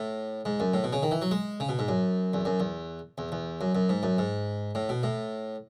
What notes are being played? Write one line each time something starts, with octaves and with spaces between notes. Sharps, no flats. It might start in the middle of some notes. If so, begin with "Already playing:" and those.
Already playing: A2
G#2
F#2
A2
B2
C#3
D#3
E3
F#3
G#3
C#3
B2
G#2
F#2
E2
F#2
E2
E2
E2
F#2
F#2
G#2
F#2
G#2
A2
B2
A2